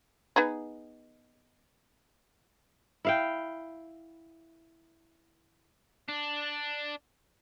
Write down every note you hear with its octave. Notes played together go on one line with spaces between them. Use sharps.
B3 D#4 G#4
E4 F5 G5
D4